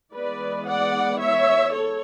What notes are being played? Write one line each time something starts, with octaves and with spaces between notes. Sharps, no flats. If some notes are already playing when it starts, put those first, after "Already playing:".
E3 G#3 B3 B4 D5
D5 F#5
C#5 E5
A4 C#5